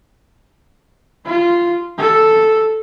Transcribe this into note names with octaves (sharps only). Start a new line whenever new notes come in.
F4
A4